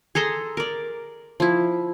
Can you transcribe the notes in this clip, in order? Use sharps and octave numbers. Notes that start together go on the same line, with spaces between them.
G#4 A4 A#5 C6
A#4 D5
F3 E4